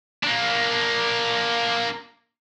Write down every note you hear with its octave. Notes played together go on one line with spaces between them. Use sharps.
A#3 D4